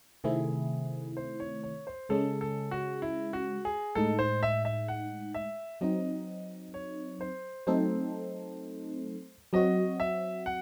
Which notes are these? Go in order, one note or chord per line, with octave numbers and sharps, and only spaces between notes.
C3 D#3 A3 C4 E4 G#4
C5
C#5
C#5
C5
C#3 G#3 C#4 G#4 A4
A4
F#4
E4
F#4
G#4
A2 G#3 D#4 A4
C5
E5
E5
F#5
E5
F#3 C4 D#4 D#5
C#5
C5
F#3 A3 C4 D#4 A4 C5
F#3 C4 F#4 D#5
E5
F#5